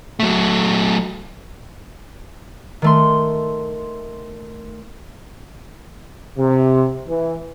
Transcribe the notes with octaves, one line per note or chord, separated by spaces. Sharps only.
F#3 A3
D#3 A3 C6
C3
E3